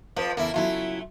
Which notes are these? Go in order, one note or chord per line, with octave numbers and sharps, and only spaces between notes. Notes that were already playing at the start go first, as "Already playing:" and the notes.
F2 F3 B4
E2 C#3 A#3 E4 A4
C#3 F#3 A3 E4 F4